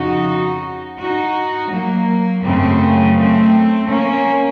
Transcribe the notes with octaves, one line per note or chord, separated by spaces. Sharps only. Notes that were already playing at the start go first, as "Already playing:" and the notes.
Already playing: F2 C#3 D#4 F#4
D#4 F#4
F#3 A#3
F#2 C#3 A3 C4
A3 C4
A#3 C#4